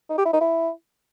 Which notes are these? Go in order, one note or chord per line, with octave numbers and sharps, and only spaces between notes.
D#4
G4
E4
D#4
E4